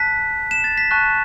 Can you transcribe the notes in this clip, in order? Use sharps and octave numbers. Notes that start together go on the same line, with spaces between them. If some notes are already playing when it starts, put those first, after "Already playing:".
Already playing: A5 F#6 B6
E7
A6
B6
A5 C#6 F#6